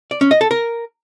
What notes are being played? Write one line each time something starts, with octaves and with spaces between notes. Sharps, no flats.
D5
C#4
D#5
A4
A#4